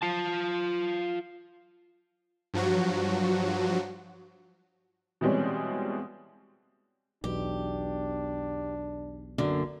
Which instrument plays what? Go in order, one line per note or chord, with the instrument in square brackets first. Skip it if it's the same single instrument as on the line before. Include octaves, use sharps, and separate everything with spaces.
[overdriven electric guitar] F4 A5
[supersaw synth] G2 F3 F#3 F#4
[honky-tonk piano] B2 E3 G3 G#3 C4 C#4
[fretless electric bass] B1 E2 B2 [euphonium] D4 [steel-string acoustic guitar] G4
[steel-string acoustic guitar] F#2 D3 A#3